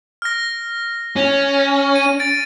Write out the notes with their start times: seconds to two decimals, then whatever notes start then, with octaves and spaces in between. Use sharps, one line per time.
0.22 F6 A#6
1.16 C#4
1.96 D#7
2.19 A6 D7